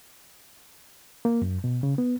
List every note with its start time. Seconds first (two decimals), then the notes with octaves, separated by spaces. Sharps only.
1.25 A#3
1.42 F#2
1.64 B2
1.83 C#3
1.98 B3